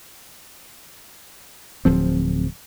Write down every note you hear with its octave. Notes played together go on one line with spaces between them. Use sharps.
D1 F3 C4